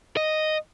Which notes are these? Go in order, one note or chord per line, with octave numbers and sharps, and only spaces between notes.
D#5